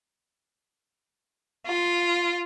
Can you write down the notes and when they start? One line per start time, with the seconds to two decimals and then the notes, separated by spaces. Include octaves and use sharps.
1.67 F4